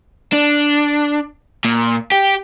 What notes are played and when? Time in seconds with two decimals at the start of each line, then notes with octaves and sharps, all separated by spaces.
0.33 D4
1.65 A#2
2.12 G4